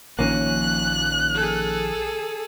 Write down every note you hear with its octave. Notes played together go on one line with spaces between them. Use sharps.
A#1 D#3 F3 A#3 C#4 F#6
G#4 A4